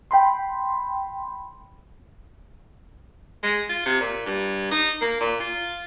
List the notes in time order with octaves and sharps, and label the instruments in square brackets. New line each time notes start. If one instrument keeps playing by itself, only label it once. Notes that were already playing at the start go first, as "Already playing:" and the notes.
[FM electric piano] G5 B5 C6
[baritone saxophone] G#3
F4
C3
A#2
G2
D#4
A#3
A#2
F4